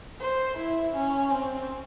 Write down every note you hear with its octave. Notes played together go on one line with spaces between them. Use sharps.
C5
E4
C#4
C4